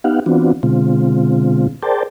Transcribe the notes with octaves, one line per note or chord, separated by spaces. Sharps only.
B3 D#4 G4 F5 F#5
E3 B3 C4 D4 F4 F#4
B2 D3 G#3 C4 F4
G#4 A#4 C5 D5 G5 A5